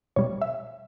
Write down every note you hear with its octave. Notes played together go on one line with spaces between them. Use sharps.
B2 G3 C#5
E5